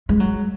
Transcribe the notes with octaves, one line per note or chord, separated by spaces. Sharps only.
G#3
F#3